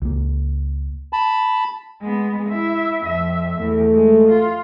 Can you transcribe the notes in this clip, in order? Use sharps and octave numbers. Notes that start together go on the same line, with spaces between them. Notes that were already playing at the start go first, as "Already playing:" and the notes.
C#2 A#3
A5 B5
G#3 B3
E4 E5
F2 E5
E2 A3
G#3
F4